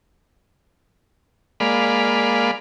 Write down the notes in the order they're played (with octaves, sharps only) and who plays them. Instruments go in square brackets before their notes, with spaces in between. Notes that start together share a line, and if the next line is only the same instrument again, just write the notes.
[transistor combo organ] G#3 A#3 D5 F5 B5